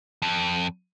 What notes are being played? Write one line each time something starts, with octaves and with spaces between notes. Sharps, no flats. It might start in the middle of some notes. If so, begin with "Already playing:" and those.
F2